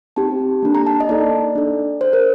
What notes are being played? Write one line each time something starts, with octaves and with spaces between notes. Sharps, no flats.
C4 D#4 G4 A5
A#3 D4 A4
A#5
A5
D#5
A#3 D#4 A4 D5
D4 A4
D4 A4 C5
A#4